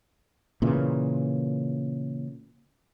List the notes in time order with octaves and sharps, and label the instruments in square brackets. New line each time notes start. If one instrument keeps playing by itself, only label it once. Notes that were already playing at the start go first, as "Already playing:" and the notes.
[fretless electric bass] A#2 C#3 E3